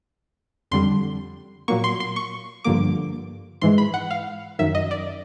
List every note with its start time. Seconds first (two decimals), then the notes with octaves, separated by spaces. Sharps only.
0.71 F2 D3 G3 C6
1.68 A#2 F#3 A#3 C#6
1.84 C6
2.00 C6
2.16 C#6
2.64 G2 D3 F3 A#3 D6
3.62 G#2 E3 G#3 C6
3.78 B5
3.94 F#5
4.11 F5
4.59 F#2 D#3 F#3 E5
4.75 D#5
4.91 D5